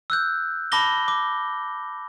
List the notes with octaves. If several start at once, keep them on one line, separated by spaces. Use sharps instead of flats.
E6 F#6 G6
A5 B5 D6 A#6 G7
D6